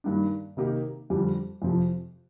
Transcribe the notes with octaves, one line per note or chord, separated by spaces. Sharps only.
G2 D#3 A#3 D4
C3 D#3 A#3 D#4 G4
F2 D3 G3 D4 G4
F2 C3 F3